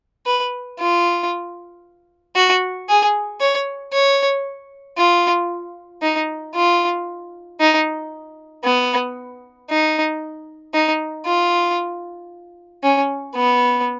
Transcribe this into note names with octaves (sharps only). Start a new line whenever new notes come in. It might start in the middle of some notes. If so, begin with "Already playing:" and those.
B4
F4
F#4
G#4
C#5
C#5
F4
D#4
F4
D#4
B3
D#4
D#4
F4
C#4
B3